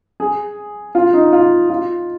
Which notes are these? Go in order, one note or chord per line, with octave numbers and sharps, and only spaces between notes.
G#4
F4
D#4
F4
F4